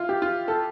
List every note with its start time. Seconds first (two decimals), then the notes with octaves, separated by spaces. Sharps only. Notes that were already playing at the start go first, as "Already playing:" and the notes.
Already playing: E4 F4
0.09 G4
0.22 F4
0.48 A4